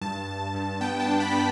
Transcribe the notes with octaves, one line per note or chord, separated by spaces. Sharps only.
G2 A5
G2
G2
B3 G5
A5
D4
B5
B3 B5